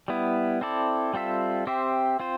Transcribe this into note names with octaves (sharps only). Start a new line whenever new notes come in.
G3 B3 E4
C4 E4 A4 D5
G3 C4 F4 A4 E5
C4 G4 C5 E5
C4 F4 C5